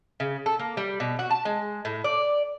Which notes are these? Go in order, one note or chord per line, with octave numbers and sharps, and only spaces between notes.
C#3
A4
A#3
G3
B2
F#4
A5
G#3
A2
D5